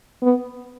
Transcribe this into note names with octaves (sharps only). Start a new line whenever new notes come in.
B3